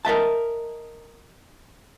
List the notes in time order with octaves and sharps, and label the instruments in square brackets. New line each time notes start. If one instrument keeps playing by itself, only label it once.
[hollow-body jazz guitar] A#4 D#5 E5 A5